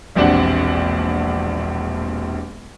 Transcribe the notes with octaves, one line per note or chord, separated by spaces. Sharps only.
E1 A#1 C4 D4 G4 F#5